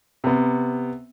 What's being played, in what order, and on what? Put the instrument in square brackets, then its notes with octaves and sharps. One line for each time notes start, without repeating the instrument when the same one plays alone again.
[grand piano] C3 B3